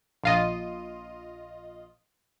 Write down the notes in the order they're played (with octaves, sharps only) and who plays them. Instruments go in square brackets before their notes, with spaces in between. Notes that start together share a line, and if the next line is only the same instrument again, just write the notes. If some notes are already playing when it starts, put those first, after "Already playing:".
[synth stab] A#1 F4 D#5